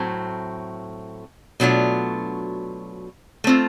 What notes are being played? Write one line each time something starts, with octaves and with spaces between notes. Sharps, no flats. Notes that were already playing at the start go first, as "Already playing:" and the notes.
Already playing: A2 F#3 A3 C4
B2 F#3 A3 D4 F4
A3 C4 F4